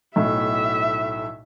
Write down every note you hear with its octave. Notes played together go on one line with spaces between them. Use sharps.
B1 A2 E5